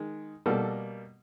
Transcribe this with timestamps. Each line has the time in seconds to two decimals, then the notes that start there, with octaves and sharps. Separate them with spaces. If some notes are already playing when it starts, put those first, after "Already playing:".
Already playing: D#3 G#3
0.46 B2 G3 A#3 A4